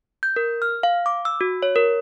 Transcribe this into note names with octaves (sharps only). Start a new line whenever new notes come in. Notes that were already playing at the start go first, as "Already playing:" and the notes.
G6
A#4
F6
F5
D6
E6
F#4
C#5
A#4